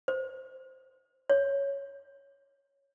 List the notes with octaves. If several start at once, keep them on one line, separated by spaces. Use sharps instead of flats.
C5
C#5